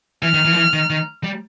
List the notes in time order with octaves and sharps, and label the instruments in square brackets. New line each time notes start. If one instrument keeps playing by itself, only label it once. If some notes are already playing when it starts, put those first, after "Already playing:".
[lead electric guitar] E3 [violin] F6
[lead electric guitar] D#3
E3
F3
E3
D#3
D#3
G3